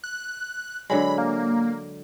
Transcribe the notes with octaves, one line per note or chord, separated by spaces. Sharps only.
F#6
D3 F#3 G#3 B5
A#3